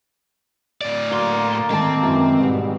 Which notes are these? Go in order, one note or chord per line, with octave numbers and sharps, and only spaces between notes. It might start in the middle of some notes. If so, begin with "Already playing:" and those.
A2 D5
A#3 F#4 C6
D#3 G#3 A3 C4 A5
F#2 E3
G#2 B2 G3